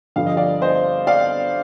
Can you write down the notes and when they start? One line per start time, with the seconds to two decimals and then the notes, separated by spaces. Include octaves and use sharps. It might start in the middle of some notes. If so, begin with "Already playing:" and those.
0.16 G2 D3 F3 F5
0.26 D#5
0.37 D5 F5
0.61 C5 D#5
1.07 D5 F5